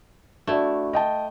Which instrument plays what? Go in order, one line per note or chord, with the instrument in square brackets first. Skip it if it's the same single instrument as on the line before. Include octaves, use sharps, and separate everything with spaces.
[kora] A3 E4 [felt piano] D4 F#4 D5
[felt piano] D#5 G5 A5